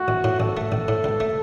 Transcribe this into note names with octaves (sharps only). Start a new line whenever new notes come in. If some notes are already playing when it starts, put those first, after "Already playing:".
Already playing: A3 F#4
A1
A2
A1 A4
A3
A1
A2
C#2
A3